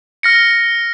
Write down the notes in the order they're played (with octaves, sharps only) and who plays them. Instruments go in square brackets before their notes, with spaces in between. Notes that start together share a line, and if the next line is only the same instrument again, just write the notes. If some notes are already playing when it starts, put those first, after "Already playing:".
[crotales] F6 A#6 C#7